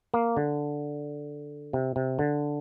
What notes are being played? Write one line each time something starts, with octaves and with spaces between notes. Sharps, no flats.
A#3
D3
C3
C3
D3